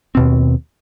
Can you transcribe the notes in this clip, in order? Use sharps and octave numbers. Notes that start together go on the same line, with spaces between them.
D#2 B2 C4